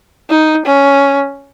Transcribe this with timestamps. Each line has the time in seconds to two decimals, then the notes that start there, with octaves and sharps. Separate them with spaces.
0.30 D#4
0.66 C#4